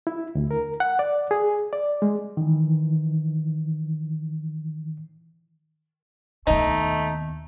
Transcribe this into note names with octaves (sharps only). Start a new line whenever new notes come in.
E4
D2
A#4
F#5
D5
G#4
D5
G#3
D#3 E3
D#2 B2 A3 D#4